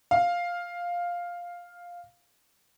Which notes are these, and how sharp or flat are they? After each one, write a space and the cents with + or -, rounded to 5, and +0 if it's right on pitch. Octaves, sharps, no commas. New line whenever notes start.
F5 +5